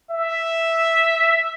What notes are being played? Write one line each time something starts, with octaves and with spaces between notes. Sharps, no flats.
E5